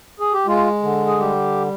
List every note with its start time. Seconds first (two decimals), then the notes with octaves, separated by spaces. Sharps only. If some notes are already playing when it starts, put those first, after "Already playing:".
0.20 G#4
0.33 G4
0.47 G#3 F4
0.83 D3
1.07 G#4
1.19 G3 G4